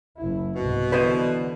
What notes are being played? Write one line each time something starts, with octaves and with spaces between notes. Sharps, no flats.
F#1 E4
C2 G#2 B2
D3 E3 B4 C5 D#5